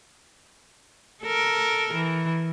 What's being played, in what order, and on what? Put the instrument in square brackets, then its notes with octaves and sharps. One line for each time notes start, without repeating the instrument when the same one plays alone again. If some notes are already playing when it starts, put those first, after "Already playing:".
[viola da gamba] A4 A#4
E3